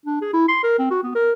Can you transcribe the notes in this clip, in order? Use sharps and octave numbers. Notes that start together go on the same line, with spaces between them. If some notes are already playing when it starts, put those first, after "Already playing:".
D4
G#4
E4
C6
A#4
C4
F#4
B3
A#4